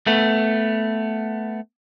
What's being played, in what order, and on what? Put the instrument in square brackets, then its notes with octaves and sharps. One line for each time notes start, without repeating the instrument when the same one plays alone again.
[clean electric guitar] A3 B3